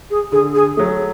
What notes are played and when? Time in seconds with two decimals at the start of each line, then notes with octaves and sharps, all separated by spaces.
0.10 G#4
0.32 D3 G#4
0.55 G#4
0.77 F#3 A3